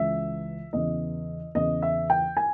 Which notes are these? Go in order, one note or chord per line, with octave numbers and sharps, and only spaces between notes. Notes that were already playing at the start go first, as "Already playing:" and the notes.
Already playing: C#2 C#3 E3 E5
E2 C#3 E3 D#5
E2 C#3 E3 D#5
E5
G5
G#5